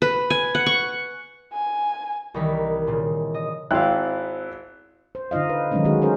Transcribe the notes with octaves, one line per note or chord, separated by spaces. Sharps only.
B4
G#5
F#5
C#6
G#5
C2 D#3 E3 D#4 A#4 B6
A#2 C#3
D#5
G#1 C4 E4 F5 B5 F#6
C5
D3 D#4 F4 D#5 F5
B4
D#3 F#3 G#3 A3 C#4 D#4
D#3 G#3 C#4 F#4 G#4
C#4 G#4 A#4 C5